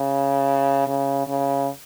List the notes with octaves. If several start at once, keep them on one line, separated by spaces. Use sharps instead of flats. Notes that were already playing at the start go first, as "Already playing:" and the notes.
Already playing: C#3
C#3
C#3